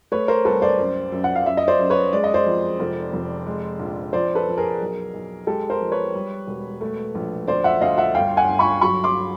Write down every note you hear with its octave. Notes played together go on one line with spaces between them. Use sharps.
A3 B4 C#5
A#4 C5
C2 A4 B4
C5 D5
F#2
F#2
F#5
F5
F#2 E5
D#5
C5 D5
F#2
B4 C#5
G#3 D5
D#5
C5 D5
F2
F1
F1
G#3
A#1
F2 C5 D5
A4 B4
F2
G#4 A#4
B1
B1
G#3 G4 A4
A#4 C5
F2
B4 C#5
G3
E1
A3
A#1
D2 C5 D5
E5 F#5
D2 D#5 F5
E5 F#5
G1 F5 G5
F#5 G#5
G1
B5 C#6
F#3 B5 C#6
C6 D6